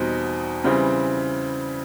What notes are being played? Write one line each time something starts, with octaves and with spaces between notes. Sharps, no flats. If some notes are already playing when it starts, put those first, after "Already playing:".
Already playing: E2 B2 G3 C4 D#4
C#3 E3 G3 C4